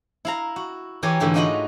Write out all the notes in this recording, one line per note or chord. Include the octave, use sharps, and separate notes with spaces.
E4 F5 A#5
F#4
E3 G4 A#4 C#5 G#5
G#2 D3 E3 A3
D4 D#4 F4 F#4 D#5 B5